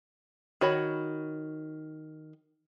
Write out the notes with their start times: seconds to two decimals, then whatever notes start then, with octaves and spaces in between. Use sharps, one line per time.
0.61 D#3 F#4 C#5 B5